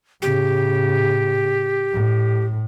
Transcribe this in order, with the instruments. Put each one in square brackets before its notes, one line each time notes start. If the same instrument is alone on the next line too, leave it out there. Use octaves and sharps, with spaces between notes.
[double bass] A2 C#3 [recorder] G4
[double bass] A2